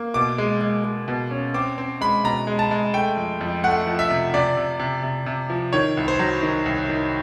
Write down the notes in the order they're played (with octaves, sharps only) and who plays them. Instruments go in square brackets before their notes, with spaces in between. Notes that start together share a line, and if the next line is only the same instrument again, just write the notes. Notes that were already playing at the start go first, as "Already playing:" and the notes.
Already playing: [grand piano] A#3
B2 D6
G#3
G#3
G#3
B2
C#4
C4 D6
C4
G#3 B5
B2 A#5
G#3
A5
G#3
A3 G5
F2
F2
A3 F#5
F3
E5
C3
C3 D5
C3
C3
C3
C3
F3
D#3 C#5
C2
C5
F#3
D#3
C2
D#3